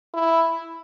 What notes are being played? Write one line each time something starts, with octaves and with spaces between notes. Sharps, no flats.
E4